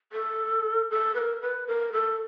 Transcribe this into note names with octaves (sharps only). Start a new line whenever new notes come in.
A4
A4
B4
A#4
B4
A#4
A4